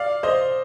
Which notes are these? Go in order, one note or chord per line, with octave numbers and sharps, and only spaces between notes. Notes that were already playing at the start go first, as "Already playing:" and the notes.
Already playing: D5 F5
C5 D#5